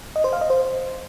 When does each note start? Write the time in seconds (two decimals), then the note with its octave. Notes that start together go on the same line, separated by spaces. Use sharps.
0.16 D#5
0.24 C5
0.33 F5
0.41 D#5
0.50 C5